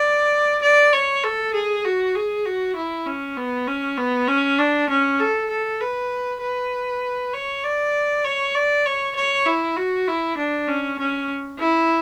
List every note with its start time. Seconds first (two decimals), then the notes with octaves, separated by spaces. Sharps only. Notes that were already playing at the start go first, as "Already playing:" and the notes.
Already playing: D5
0.62 D5
0.93 C#5
1.24 A4
1.54 G#4
1.84 F#4
2.15 G#4
2.45 F#4
2.76 E4
3.07 C#4
3.37 B3
3.67 C#4
3.98 B3
4.28 C#4
4.58 D4
4.89 C#4
5.19 A4
5.50 A4
5.81 B4
6.41 B4
7.33 C#5
7.63 D5
8.24 C#5
8.55 D5
8.85 C#5
9.16 C#5
9.46 E4
9.76 F#4
10.07 E4
10.37 D4
10.68 C#4
10.99 C#4
11.59 E4